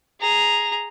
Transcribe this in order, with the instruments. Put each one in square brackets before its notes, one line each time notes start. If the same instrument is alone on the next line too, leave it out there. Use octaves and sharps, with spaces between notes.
[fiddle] G#4 A#5